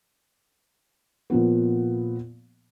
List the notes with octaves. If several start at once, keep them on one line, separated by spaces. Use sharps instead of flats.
A#2 F3 B3